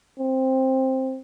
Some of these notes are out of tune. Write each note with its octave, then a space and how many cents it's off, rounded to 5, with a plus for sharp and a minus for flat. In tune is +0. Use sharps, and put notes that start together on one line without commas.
C4 +10